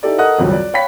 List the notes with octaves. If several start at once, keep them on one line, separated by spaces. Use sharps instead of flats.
D#4 E4 G4 A4 D5
A4 A#4 D#5 F#5 D#6 F#6
G#1 C#2 F#2 F#3 G3
D5
C#5 F5 G5 B5 B6